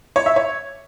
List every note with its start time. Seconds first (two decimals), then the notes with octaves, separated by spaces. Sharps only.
0.16 C#5
0.26 E5
0.36 C#5